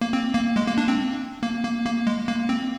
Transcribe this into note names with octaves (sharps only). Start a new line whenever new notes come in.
A#3
C4
A#3
G#3
A#3
D4
C4
A#3
A#3
A#3
G#3
A#3
C4